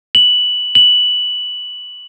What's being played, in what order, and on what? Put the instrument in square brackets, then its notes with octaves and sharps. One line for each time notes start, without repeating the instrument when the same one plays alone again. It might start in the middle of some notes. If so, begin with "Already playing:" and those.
[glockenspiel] F#7
F#7